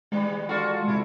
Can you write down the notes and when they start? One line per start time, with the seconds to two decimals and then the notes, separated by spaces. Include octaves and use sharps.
0.12 D#3 G3 G#3
0.49 F4 F#4 A4
0.88 C3 E4